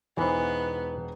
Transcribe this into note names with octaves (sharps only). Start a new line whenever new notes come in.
E1 E3 B3 D#4 C5